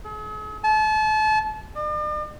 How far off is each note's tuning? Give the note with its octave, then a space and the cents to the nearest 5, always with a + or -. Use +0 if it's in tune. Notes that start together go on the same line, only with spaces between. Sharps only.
G#4 +45
A5 -35
D5 +45